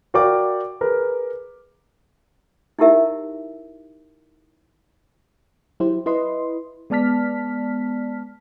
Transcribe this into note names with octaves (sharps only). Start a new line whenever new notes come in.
F#4 A#4 D5 F5 G5 D6
G#4 A#4 B4
D#4 E4 G4 A#4 E5
F#3 E4 G4 C5
E4 B4 D#5 C6
G#3 B3 D5 A5 F6 B6